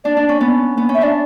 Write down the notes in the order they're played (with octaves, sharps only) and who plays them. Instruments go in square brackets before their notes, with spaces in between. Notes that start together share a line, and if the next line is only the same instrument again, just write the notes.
[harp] D4 [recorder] D5
[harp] D4
C#4
B3
B3
C#4
[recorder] E5
[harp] D4 [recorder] D5